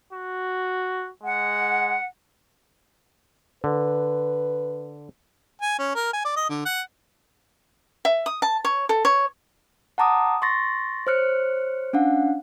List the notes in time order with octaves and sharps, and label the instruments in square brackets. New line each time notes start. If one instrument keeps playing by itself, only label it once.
[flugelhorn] F#4
[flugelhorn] G#3 [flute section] F#5
[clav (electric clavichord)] D3 [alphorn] B4
[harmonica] G#5
C#4
A#4
G#5
D5
D#5
D3
F#5
[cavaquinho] E5
D#6
A5
C#5
A4
C#5
[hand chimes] F#5 A5 A#5 D6 D#6
C6 C#6 A6 A#6
C5 C#5 F6 F#6 C#7
C#4 D4 F5 F#5